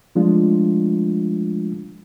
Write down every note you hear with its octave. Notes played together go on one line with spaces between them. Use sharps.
F3 G#3 A3 D4 F4